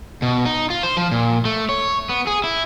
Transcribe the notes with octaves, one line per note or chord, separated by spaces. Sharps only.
B2
D#4
F4
C5
F3
A#2
A3
C#5
B3
G#4
E4